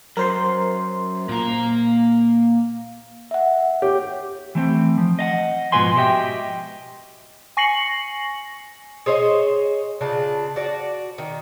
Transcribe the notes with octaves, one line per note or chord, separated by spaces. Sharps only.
F#2 A#4 C5 C6
A#2 A#3 A#5
E5 F#5
G4 C#5
E3 A3 C4
F3
D#5 F5 F#5
G#2 B2 F3 B4 G#5 C6
F#4 G4 D#5 E5 G5
G#5 C#6 A#6 C7 C#7 F#7
G#4 C5 C#5 D#5
C#3 D4 F4
F#4 D5
D#3